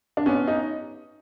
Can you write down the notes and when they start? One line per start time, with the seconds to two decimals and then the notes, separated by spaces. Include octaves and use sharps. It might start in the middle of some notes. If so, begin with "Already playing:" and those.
0.17 D4
0.26 B3 C#4
0.47 D#4